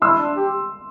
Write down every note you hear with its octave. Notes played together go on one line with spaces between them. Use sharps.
E4 C6 E6
D4
G4